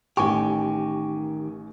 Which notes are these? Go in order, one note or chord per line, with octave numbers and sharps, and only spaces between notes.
A1 D#3 G4 G#5 C#6